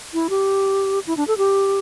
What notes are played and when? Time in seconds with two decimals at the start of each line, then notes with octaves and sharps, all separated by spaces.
0.14 E4
0.30 G4
1.07 E4
1.17 D4
1.28 A4
1.38 G4